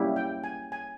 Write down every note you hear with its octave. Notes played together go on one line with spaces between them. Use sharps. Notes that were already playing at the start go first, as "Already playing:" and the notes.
Already playing: G3 A#3 C#4 E4 G4
G5
G#5
G#5